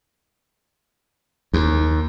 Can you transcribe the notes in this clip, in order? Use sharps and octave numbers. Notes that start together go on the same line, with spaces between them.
D#2